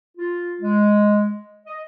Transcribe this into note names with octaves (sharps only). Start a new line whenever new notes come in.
F4
G#3
D#5